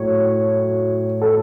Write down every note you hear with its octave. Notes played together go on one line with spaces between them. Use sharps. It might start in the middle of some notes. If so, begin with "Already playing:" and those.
Already playing: A2 F#3 C#5
A4